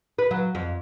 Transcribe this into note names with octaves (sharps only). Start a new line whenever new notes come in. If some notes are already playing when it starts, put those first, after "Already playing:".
B4
F#3
F2